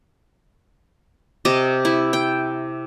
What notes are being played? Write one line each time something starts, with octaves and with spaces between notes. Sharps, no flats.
C3 G4 D#5
E4
G5